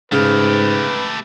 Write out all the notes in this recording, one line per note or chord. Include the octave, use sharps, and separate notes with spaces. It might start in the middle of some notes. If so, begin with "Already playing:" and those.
G#2 C#3 A3 G4 B4